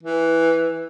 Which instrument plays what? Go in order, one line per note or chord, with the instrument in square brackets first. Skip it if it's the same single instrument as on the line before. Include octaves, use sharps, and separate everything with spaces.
[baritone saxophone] E3